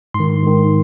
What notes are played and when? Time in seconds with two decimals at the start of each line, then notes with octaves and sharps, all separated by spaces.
0.14 G#2 C6
0.20 D#3
0.43 G#2 D#3